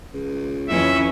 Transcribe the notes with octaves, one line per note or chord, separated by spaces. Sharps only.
C#2
F2 E3 C#4 E5